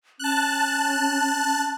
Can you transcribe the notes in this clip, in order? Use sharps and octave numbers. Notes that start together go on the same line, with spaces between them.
C#4 A5 F#6